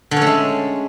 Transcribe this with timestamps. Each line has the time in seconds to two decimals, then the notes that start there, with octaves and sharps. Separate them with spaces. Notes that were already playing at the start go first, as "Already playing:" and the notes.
0.11 D3
0.16 C#4
0.22 A3
0.27 G#3